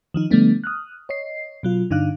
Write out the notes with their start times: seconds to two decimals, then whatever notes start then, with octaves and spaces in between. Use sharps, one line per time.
0.14 D#3 F3 D#4
0.31 D3 F3 G3 A3 B3 D4
0.64 D#6 F6 F#6
1.09 C#5 D#5 C7
1.63 B2 F#3 F4
1.91 G2 D3 D4 D#4 F5 F#6